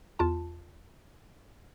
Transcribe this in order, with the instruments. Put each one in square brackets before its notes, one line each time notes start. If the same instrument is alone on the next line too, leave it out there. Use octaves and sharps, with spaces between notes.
[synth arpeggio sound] E2 F4 A5